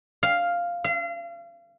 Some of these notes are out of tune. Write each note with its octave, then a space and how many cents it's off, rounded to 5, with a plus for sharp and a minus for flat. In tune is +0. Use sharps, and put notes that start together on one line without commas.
F5 +0
F5 -35